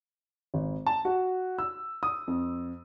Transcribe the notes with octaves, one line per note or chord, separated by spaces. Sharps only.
G#1
A5
F#4
E6
D#6
F2